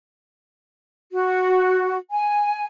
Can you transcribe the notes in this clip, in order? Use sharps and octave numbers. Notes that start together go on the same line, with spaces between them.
F#4
G#5